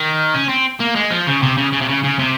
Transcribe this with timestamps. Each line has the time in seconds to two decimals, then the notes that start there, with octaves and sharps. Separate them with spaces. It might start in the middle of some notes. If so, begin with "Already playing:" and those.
Already playing: D#3
0.35 C#4
0.49 C4
0.80 A#3
0.96 G#3
1.11 F3
1.27 C#3
1.42 C3
1.57 C#3
1.73 C#3
1.81 C3
1.88 C#3
2.04 C#3
2.19 C3